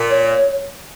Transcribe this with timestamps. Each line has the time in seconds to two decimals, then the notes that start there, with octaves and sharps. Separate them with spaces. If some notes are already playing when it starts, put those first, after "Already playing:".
Already playing: A#2
0.09 C#5